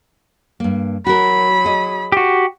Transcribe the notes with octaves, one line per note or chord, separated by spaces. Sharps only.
G2 A#3
F#3 F#4 A#4 B5
G#4 D#5
F#4 G4